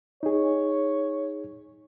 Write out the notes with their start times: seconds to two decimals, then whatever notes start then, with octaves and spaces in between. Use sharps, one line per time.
0.23 D#4 G#4 C#5